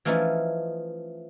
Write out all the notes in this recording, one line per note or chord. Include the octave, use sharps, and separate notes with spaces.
E3 F3 A3 C#4 D#4 E4